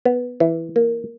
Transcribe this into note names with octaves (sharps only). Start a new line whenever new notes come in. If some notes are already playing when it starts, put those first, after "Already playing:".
B3
E3
A#3